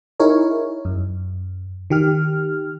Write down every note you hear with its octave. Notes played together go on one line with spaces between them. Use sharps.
D#4 E4 G#4 A#4 C#5
F#2
D#3 G4 F6